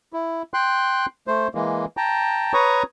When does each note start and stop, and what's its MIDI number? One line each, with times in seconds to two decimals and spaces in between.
0.13 0.42 64
0.54 1.06 79
0.54 1.06 84
0.54 1.06 90
1.27 1.48 57
1.27 1.48 72
1.55 1.85 52
1.55 1.85 56
1.55 1.85 58
1.97 2.53 79
1.97 2.53 81
1.97 2.53 82
2.53 2.83 71
2.53 2.83 73
2.53 2.83 82
2.53 2.83 85
2.53 2.83 87